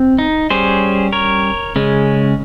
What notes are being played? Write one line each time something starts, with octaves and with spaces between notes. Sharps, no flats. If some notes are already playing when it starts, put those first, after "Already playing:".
Already playing: C4
D#4
G3 C#4 G#4 C5
A#4 C#5
C#3 G#3 C#4